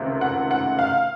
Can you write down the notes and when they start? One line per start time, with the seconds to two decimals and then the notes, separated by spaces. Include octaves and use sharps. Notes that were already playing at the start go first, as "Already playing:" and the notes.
Already playing: C#2 C3 D#3 A3 C4
0.21 F#5
0.51 F#5
0.79 F5